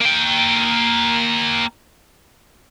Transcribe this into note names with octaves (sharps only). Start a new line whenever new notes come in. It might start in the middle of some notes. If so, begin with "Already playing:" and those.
A#3 G5